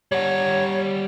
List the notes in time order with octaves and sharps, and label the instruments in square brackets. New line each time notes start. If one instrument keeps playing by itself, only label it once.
[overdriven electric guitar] G3 F#5 [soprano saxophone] C#5